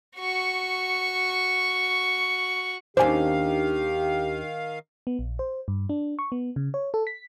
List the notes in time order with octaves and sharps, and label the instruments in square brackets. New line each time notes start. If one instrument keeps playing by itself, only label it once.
[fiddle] F#4 C#6
[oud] D#2 C#4 D4 [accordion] D#3 F5 [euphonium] G4 [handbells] C5 G#5
[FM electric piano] B3
A#1
C5
G2
D4
C#6
B3
C#3
C#5
A4
B6